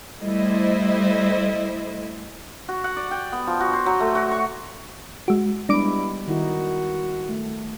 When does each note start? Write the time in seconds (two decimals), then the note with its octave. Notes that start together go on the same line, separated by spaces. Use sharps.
0.22 G3 A3 E4 C5 D#5
2.68 F#4
2.84 F#5
2.97 D5
3.11 G5
3.32 B3
3.47 F3
3.61 F#4
3.73 C5
3.86 F#3
4.00 A3
4.15 F#4
4.31 C#6
5.28 G#3 F#4
5.69 G3 G#3 B3 D4 E4 D6 D7
6.27 D#3 D#4 E4 F#4
7.29 A3